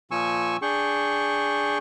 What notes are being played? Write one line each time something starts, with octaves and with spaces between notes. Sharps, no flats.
A#2 F3 G#5 C#6 E6
D4 G#4 G5 C#6